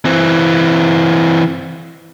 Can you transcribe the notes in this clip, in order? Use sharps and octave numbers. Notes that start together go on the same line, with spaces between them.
E3 C4